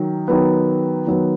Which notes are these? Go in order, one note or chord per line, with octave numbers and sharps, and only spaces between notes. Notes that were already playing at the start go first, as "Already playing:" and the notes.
Already playing: D#3 F#3
D#3 F#3 B3
D#3 F#3 B3